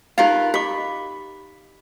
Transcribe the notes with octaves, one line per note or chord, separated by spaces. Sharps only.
D#4 F4 G4 A#4 B4 F5
G4 D#5 B5 D6